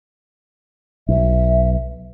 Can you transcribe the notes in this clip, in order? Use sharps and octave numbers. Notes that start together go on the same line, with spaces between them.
B1 E5